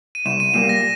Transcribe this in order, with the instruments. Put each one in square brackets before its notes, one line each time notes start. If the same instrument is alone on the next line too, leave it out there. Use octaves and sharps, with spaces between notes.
[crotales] D#7
[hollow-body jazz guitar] C2 [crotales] E7
[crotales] D#7
[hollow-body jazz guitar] A#2 G3 A#3 [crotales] E7
[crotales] A#6